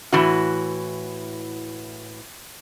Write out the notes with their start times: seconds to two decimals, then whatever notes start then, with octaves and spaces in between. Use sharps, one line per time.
0.12 A2 E3 F#4